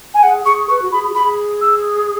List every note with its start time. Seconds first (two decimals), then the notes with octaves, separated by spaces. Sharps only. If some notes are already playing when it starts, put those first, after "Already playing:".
0.14 G#5
0.23 G#4 F#5
0.46 G#4 C#6
0.69 B4 C#6
0.82 F#4
0.92 G#4 B5
1.09 F#4
1.15 G#4 B5
1.61 E6